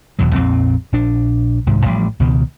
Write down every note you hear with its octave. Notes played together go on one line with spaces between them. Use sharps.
D#1 E2 B2 F#3
A#1 F2 A#2 C4
A#1 D4
C2 G#2 D#3
A1 A2 F3 G3
C#2 B2 D#3